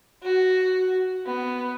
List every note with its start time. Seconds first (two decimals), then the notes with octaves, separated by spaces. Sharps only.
0.23 F#4
1.26 B3